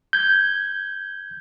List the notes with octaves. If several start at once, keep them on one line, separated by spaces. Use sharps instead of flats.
G6 G#6